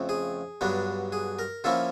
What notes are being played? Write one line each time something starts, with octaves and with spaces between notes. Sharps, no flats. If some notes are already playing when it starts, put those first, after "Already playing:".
Already playing: F2 C#3 F3 A3 C4
G#4
G2 D3 F#3 B3 D4
G#4
A#4
D3 F3 A#3 C#4 E4 A4